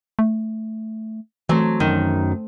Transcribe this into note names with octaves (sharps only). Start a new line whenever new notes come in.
A3
E3 F#3 A3 C4
F#2 D#3